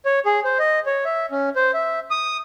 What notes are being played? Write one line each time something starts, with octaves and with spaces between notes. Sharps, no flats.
C#5
G#4
C5
D#5
C#5
E5
C#4
C5
E5
D#6